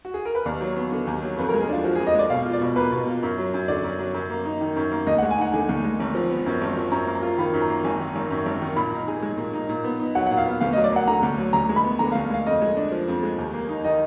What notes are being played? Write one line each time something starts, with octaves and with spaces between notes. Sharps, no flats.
F#4
G#4
A#4
B4
D#2 D5
F#3
B3
D3
D#2
F#3
F2 B4
A#4
G#3
G#4
D4 F4
F3 F#4
G#4
F2
D#5
G#3 D5
B2 F5
F4
D5
B2
A#3 B4
B2
F4
F#2
F#3
F#2
D3 D5
F#2
F#3
F#2
A#3
D#4
D#3
F#2
A#3
D2 D#5
F#5
G#3
G#5
D#4 F#5
D3 G#5
D2
G#3
G#1
F3
B3
F#2
G#1
F3
F#2 A#5
A#3
A#5
F4
D#3 B5
F#2
A#5
A#3
G#1 G#5
D#3
G#1
F#2
G#1
D#3
A#2 B5
D#4
G#4
G#3
A#2
D#4
A#2
B3
D#4
F#3 F#5
F#5
A#2
F5
B3
D2 F5
D#5
F#3
D5
A#3 F#5
D3 A#5
D2
F#3
D2 A#5
G#3
B5
B3
D3 A#5
F5
D2
G#3 F5
F2 D#5
G#3
D4
F3
F2
G#3
D#2
A#3
D#4
D#3 D#5